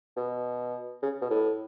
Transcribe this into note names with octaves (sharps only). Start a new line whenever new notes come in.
B2
C#3
B2
A2